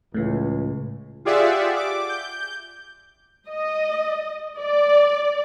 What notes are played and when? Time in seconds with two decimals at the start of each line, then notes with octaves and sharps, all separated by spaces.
0.14 C#2 A2 C#3 E3
1.25 F4 G4 G#4 D5 E5 F#5
1.76 D6
2.09 G6
3.49 D#5
4.59 D5